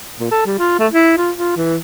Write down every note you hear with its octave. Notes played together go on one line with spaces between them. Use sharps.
A#2
A4
G3
F4
A3
E4
F4
F4
E3